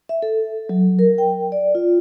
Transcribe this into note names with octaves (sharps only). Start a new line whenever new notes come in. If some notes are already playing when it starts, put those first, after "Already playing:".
E5
A4
F#3
A#4
G5
D5
F4